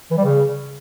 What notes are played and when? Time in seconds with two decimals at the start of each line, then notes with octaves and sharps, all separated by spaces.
0.11 E3
0.17 G3
0.24 C#3